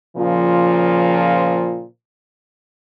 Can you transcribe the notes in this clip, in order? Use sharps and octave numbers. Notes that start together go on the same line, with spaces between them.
A#2 C#3 F3